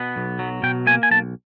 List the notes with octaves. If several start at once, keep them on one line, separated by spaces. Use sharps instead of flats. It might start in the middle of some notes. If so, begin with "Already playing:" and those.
Already playing: B2 B3
B1
F#3
B2 G5
A#3 G#5
G#5
B1 A5